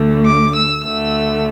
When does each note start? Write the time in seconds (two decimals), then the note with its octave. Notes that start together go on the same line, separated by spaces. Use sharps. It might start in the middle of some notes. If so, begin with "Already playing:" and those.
Already playing: D2 D3 A3
0.26 D6
0.55 E6
0.85 D2 D3 A3 E6